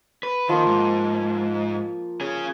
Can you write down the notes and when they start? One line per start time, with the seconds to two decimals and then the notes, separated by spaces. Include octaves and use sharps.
0.23 B4
0.49 D#3 F3 A#3
0.67 G#2
2.21 C#4 G#4